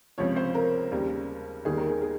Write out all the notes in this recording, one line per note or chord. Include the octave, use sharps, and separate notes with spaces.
C#2 C3 F3 C#5
C5
A#4
D#2 C#3 G3
D#2 D#3 G3 G#4
A#4
G#4
G#4